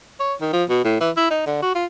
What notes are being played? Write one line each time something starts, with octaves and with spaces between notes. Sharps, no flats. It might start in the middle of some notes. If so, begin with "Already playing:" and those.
C#5
D#3
F3
B2
A2
E3
E4
D#4
D3
F#4
F4